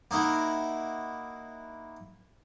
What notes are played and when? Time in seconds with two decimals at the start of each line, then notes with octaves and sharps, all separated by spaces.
0.11 A#3 D#4 E4 F#4